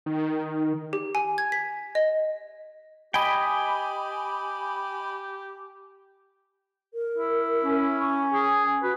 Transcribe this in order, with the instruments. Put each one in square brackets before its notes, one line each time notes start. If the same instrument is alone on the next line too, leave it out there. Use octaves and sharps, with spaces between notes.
[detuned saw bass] D#3
[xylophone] G4
G#5
G#6
B6
D#5
[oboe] G4 [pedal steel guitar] D#5 G5 [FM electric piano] G#5 B5
[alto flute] A#4
[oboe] E4
[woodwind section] C#4
[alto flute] C#6
[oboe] G#4 [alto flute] G#5
[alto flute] F#4 [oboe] B4